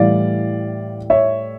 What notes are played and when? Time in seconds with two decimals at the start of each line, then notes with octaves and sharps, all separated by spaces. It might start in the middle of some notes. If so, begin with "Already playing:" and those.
Already playing: A2 E3 G3 D5 F5
1.10 C#5 E5